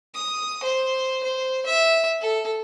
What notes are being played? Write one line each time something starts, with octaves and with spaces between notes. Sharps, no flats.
D#6
C5
C5
E5
A4